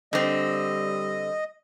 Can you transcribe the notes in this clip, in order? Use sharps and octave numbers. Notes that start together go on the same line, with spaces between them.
D3 G3 C4 D#5